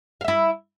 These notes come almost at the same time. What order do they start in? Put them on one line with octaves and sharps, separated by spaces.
F5 E5 E4